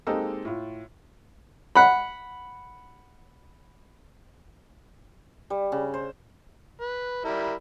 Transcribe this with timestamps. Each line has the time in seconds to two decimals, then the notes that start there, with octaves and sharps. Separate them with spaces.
0.07 G#3 A#3 C4 D#4 G4 A4
0.45 A2 F4
1.75 F#5 B5
5.50 G3
5.72 C#3
5.94 C5
6.80 B4
7.25 G3 E4 A#4